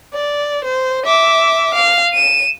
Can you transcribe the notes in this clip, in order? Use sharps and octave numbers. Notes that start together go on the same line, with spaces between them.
D5
C5
E5 D6
F5
D#7 E7